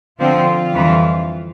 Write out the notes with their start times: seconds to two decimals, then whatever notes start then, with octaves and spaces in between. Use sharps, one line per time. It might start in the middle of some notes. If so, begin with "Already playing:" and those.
0.20 D3 F3 C4 F4
0.72 F2 E3 G3